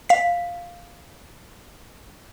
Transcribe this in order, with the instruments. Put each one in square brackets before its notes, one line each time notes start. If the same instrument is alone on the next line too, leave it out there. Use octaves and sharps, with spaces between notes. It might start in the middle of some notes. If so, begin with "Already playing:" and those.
[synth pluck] F5 B6